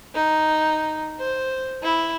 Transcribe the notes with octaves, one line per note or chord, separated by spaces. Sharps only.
D#4
C5
E4